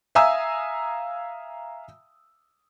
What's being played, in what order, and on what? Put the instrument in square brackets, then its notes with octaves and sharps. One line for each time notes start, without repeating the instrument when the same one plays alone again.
[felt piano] E5 F5 G#5 A#5 D#6 E6